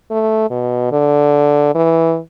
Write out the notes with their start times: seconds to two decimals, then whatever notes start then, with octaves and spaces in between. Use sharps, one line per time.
0.11 A3
0.51 B2
0.92 D3
1.75 E3